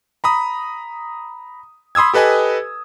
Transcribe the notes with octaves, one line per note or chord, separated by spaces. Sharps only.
A#5 B5 D#6
B5 C6 D#6 E6 G#6
G4 A4 B4 D#5 G#5 B5